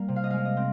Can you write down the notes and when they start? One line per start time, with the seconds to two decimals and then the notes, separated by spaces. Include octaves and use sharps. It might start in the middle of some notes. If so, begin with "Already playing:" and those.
Already playing: G3 A#3
0.08 C3
0.16 F5
0.24 D#5
0.30 G#3 F5
0.45 D#5
0.57 C4